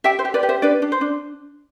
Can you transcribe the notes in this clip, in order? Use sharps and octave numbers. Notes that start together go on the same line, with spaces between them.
G4 E5 G5
C5
G4
B4 D5
G4
C5 E5
D4 B4 D5
D4
C5
D4